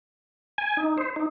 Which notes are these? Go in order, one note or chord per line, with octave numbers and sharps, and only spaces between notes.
G#5
D#4
C5
D#4